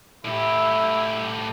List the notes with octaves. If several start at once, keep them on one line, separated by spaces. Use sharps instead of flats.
A2 E4 G4